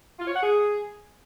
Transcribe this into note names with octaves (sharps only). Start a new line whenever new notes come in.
F4
C#5
F#5
G#4